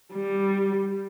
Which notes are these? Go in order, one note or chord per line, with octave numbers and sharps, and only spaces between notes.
G3